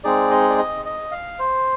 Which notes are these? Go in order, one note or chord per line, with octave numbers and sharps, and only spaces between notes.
G#3 C4 D#4 G#4 D5
D#5
D5
D#5
D#5
F5
C5